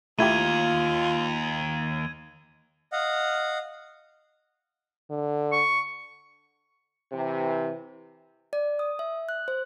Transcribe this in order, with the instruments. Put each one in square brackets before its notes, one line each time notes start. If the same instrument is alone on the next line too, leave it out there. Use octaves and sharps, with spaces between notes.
[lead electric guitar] D#2 [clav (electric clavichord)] A3 E4 G4 [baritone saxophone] F4 [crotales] G#6 D#7
[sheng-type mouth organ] D#5 F5 F#5
[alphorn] D3
[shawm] C#6
[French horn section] C3 E3
[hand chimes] D5
D#6
E5
F#6
C5